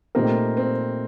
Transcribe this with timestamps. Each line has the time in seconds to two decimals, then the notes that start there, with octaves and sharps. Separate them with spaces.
0.15 A#2 A3 C4 D#4 G4 A#4
0.57 C4